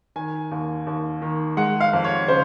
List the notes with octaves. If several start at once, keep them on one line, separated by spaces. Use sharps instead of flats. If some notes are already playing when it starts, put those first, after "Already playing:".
D#3 G#5
D#2
D#2
D#3
G#3 F#5
F5
F2
C#5
C#3 C5